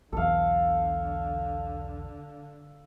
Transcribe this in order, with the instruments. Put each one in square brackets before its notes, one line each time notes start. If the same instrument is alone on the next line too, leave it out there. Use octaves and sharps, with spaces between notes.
[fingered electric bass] B1 E2 E3 [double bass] D3 [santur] A4 F5